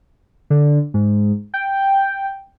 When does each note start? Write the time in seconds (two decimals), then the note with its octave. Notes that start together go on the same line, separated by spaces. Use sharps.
0.50 D3
0.94 G#2
1.54 G5